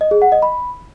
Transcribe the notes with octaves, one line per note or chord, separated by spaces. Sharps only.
D#5
G#4
F#5
D#5
B5